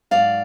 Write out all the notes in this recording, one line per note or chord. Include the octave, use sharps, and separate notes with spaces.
G#2 F#3 D5 F5